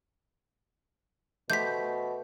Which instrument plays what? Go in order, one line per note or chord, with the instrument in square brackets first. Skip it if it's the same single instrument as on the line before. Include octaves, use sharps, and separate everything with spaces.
[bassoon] B2 [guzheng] A3 G4 C5 [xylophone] G6 B6